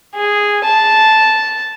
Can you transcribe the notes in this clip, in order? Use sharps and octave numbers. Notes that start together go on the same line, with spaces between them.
G#4
A5